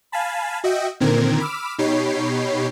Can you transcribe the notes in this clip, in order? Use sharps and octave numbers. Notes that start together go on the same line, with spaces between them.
F5 G#5 A5 B5
F#4 D#5 E5 G5
A#2 D3 D#3 C4 A#4 G#6
B5 D6 E6 F6
B2 D#4 G4 C#5 B5 C7